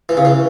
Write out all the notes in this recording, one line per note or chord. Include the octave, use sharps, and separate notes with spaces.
E3
C#3
E3